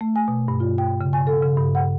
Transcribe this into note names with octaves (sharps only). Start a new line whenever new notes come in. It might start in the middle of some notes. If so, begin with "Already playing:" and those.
A3
G#5
B2
G2
F4
G5
C#3
G#5
A4
C#3
G2
F#5